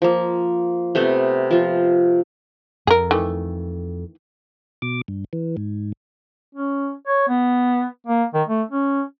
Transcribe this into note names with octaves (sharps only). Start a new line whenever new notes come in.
F3 A#3
C3 A3 B3 C5
F3 F4
F2 G#4 A#4
D#3 E3 A3
B2 D6
G2
E3
G#2
C#4
C#5
B3
A#3
D#3
A3
C#4